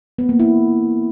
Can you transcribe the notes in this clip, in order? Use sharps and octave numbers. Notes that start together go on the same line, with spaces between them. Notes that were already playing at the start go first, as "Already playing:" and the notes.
B3
A#3
E4